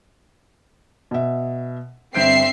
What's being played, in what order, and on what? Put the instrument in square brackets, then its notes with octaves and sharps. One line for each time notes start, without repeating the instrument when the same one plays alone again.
[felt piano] B2 E5
[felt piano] G1 G6 D7 [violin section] C4 E5 C7